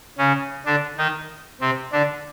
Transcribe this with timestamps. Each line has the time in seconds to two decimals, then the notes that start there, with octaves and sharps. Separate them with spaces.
0.18 C#3 C#4
0.66 D3 D4
0.97 D#3 D#4
1.61 C3 C4
1.92 D3 D4